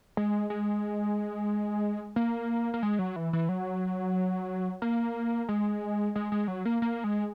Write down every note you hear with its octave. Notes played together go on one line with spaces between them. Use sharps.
G#3
G#3
A#3
A#3
G#3
F#3
E3
E3
F#3
A#3
G#3
G#3
G#3
F#3
A#3
A#3
G#3